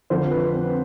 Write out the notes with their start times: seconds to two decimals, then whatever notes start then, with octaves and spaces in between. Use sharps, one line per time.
0.10 F2 D3 F3 C5
0.31 B4
0.53 C4